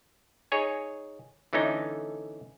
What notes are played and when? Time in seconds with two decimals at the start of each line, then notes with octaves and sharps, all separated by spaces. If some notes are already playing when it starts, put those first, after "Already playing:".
0.52 D#4 G#4 C#5 G#5
1.53 D3 E3 A3 C#4 D#4